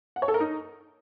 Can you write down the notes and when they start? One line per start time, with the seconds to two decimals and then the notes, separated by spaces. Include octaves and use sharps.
0.16 F#5
0.22 C#5
0.28 A4
0.34 A#4
0.40 D#4